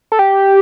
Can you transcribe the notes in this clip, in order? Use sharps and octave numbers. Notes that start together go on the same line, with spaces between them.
A4
G4